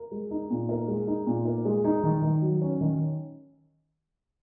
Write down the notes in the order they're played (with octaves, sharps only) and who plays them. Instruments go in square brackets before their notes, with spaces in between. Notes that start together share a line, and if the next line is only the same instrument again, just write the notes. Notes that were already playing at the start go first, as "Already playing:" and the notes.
Already playing: [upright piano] A#4
G#3
D#4
A#2
A#4
G#3
D#4
A#2
A#4
G#3
D#4
D#3
D#3
F#3
C#4
D#3